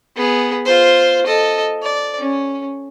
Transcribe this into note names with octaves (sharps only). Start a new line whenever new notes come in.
B3 G#4
F4 C5
A4 D#5
D5
C#4